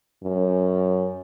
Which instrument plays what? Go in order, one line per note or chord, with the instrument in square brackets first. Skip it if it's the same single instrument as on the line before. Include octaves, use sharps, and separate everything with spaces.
[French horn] F#2